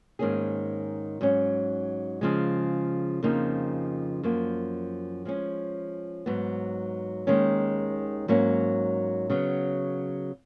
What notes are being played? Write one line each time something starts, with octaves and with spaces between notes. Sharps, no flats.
G#2 D#3 A#3 C#4 G#4
G#2 F#3 C#4
C#3 F3 G#3
F2 C#3 F3 A#3 D#4
F#2 F3 A#3
F3 G#3 C#4
G#2 F#3 B3
D#2 D#3 G#3 C#4
G#2 F#3 A#3 C#4
C#3 F#3 B3